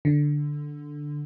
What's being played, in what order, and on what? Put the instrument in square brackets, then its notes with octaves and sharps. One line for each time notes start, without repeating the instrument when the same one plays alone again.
[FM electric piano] D3